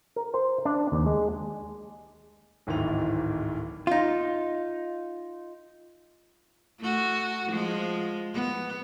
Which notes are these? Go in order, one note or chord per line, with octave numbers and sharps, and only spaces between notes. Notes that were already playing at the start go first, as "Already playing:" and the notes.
A#4
C5
D4
D#2
G#3
D1 G#1 G#2 D#3 E3 F7
D#4 F4
A3 F#4
F3 G#3
B3